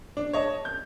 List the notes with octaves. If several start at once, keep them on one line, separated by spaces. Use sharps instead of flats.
D4
C#5 D#5 A5
G6